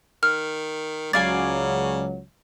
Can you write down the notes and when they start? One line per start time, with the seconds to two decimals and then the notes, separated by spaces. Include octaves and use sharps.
0.23 D#3 F6
1.13 C#2 C#3 F#3 D5 F5 G#5 A6